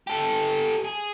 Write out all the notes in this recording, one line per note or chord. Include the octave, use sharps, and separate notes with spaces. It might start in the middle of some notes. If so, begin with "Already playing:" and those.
G4 A4
G#4